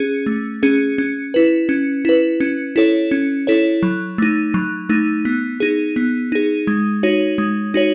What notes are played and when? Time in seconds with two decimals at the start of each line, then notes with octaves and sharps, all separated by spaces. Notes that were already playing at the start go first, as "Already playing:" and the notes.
Already playing: C#4 G#4
0.26 A3
0.63 C#4 G#4
0.98 C#4
1.34 E4 B4
1.69 C#4
2.05 E4 B4
2.40 C#4
2.76 E4 A4 C#5
3.11 C#4
3.47 E4 A4 C#5
3.83 F#3
4.18 A3 D#4
4.54 F#3
4.89 A3 D#4
5.25 B3
5.60 D#4 G#4
5.96 B3
6.32 D#4 G#4
6.67 G#3
7.03 D#4 F#4 C#5
7.38 G#3
7.74 D#4 F#4 C#5